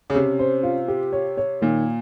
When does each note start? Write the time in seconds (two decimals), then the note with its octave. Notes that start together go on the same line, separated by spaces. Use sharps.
0.10 C#3
0.15 C3 C#4
0.39 C5
0.63 F4
0.88 G4
1.12 C#5
1.37 C#5
1.62 A#2 D#3